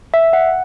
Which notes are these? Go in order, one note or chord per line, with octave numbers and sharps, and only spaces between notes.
E5
F#5